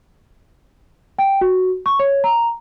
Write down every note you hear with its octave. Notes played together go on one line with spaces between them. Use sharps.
G5
F#4
C#6
C#5
A#5